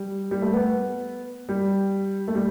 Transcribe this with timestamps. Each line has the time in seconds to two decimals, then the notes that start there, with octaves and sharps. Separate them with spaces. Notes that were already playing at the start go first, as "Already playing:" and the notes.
Already playing: G3
0.31 G3
0.42 A3
0.53 B3
1.49 G3
2.28 A3
2.35 G3